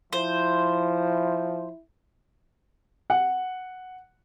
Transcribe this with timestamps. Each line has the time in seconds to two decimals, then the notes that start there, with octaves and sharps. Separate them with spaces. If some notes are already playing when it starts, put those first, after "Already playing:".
0.13 F3 E4 C5
3.10 F#5